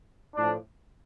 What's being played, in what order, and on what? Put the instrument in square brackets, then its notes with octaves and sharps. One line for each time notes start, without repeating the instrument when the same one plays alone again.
[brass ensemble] A2 F3 D4